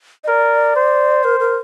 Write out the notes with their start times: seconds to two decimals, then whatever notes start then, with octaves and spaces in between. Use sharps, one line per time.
0.24 D#5
0.28 A#4 D5
0.76 C5
1.24 A#4
1.40 A#4